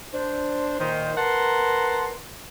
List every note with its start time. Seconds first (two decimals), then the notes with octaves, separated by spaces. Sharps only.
0.14 D4 C5
0.79 A#2 D#3 C5
1.16 A#4 B4 F#5 A5 A#5 C6